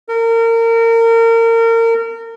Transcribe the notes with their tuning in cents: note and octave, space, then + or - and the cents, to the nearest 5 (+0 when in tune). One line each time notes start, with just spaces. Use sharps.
A#4 -30